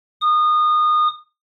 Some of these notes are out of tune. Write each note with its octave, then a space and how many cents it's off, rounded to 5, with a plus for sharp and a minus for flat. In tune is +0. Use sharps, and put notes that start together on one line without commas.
D#6 -25